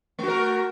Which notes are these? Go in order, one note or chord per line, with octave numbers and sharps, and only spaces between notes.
A3 F#4 A#4